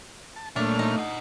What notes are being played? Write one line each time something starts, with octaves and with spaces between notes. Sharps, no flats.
A5
A#2 A3 A#3 D4 C#5 E5 F6
D#4
D#5 F#5